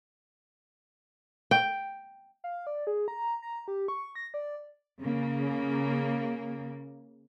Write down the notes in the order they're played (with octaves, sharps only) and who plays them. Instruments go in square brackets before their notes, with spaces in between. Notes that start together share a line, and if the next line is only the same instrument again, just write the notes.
[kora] G5
[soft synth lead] F5
D5
G#4
A#5
A#5
G4
C#6
A#6
D5
[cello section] C#3 A#3